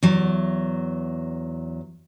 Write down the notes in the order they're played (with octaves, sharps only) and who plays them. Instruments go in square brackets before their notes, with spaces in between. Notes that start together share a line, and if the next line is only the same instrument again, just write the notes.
[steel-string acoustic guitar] E2 F#3